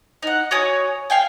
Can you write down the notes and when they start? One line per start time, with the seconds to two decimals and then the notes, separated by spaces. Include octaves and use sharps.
0.23 D#4 F#5
0.51 F#4 C#5 G#5 D#6
1.10 F5 G5 G#5